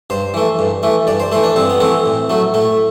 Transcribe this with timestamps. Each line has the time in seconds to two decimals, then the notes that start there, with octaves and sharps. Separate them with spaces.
0.10 G2 C5
0.34 E3 A3
0.59 G2
0.83 E3 A3
1.07 G2 D5
1.20 C5
1.32 E3 A3 C5
1.44 D4
1.56 G2 C4
1.70 B3
1.80 E3 A3 C4
2.06 A2
2.30 F#3 A3
2.54 A2 A3